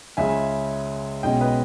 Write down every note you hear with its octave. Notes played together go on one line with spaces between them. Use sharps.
C#2 C#3 G#3 C#4 E5 G#5
B1 B2 G#3 C#4 D#5 G5
B4 D#5